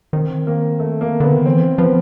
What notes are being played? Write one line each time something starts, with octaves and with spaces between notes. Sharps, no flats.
D#3 C4
A#3
A3
A#3
D3 B3
D#3
E3 C4
F3 B3